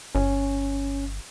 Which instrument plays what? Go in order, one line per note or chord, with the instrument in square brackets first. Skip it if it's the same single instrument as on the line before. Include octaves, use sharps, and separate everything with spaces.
[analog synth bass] G1 [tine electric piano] C#4